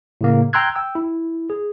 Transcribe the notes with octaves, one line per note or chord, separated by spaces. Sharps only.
A2 C#3 A#3
G5 A#5 C6 E6 F#6 G#6
G5 E6
E4
G#4